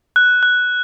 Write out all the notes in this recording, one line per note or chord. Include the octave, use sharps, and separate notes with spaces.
F#6
F#6